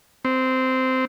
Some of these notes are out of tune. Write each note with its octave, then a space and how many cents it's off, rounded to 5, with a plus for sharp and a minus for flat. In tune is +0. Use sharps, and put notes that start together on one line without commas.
C4 -10